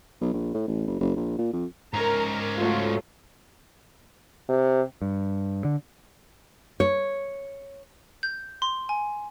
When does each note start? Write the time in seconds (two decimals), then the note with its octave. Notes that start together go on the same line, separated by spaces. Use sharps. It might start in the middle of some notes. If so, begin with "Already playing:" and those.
0.21 B1
0.34 A#1
0.54 A2
0.68 A1
0.87 F#1
1.00 F#1
1.16 A#1
1.39 A#2
1.53 F2
1.94 G#2 C#4 A#4 A#5
2.56 F#3 A3 F4
4.49 C3
5.02 G2
5.65 D3
6.80 C#5
8.23 G6
8.62 C6
8.89 G#5